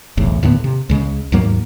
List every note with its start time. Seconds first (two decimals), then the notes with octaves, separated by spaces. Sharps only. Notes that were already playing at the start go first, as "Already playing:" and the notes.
0.17 F#1 B1 E2 A2
0.43 D#2 A2 D3 B3
0.64 C3
0.89 C#2 C#3 G#3
1.32 D#2 G#2 F#3 A#3